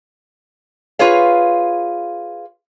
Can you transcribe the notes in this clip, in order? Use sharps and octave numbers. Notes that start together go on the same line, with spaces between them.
F4 G#4 B4 C#5 F5